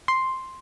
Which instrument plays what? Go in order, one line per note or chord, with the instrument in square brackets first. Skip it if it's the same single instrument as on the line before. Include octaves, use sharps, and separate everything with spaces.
[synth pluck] C6